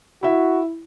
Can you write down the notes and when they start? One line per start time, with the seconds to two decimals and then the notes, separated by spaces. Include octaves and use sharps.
0.23 E4 F#4 E5